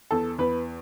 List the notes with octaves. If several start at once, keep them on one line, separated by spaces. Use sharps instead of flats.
E2 A4
E2 B4